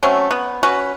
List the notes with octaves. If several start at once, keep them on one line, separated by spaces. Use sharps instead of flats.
F#3 A3 C4 C#4
B3
C#4 F#4 B4